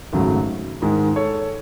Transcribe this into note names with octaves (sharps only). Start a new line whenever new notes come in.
G#1 F#2 C#3 F#3 A3
G#2 D#3 G#3
A4 C#5